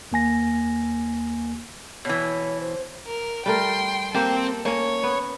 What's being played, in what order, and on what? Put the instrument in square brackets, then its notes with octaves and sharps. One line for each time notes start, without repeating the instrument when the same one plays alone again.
[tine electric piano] D#2 A#3 G#5 A#6
[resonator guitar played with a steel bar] B2 E3 [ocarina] C#5
[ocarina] C5
[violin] A#4
[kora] G3 A3 A#4 [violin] G5 C6
[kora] A#3 G4 [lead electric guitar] C4 [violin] A4
[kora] A#3 C#4 [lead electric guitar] C#5
[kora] B3